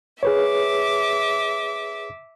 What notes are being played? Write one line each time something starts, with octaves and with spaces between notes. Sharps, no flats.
G#4 B4 C#5 E5 D6